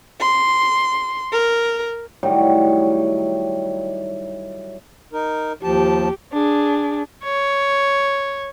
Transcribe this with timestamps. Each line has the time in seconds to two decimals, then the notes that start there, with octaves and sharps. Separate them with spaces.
0.20 C6
1.32 A#4
2.23 A2 D#3 F#3 G3
5.13 D#4 A#4
5.63 D#2 F3 G4 A5
6.33 D4 G#4
7.24 C#5